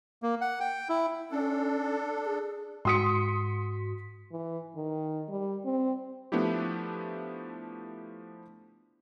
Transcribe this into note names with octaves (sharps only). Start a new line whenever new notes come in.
A#3
F#5
G5
E4
C#4 D4 A4
G#4
G#2 F#4 C6 D#6 B6 C#7
E3
D#3
G3
C4
F3 A3 B3 D4 E4 G4